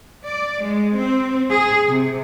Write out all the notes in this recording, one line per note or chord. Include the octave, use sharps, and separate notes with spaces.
D5
G#3
C4
G#4
C3